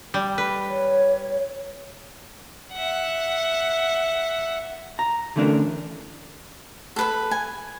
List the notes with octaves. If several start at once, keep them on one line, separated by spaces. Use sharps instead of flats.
G3
B4
C#5
E5 F#5
A#5
D3 E3 A3 C#4 D4 A#4
A4 B4 B5
G#5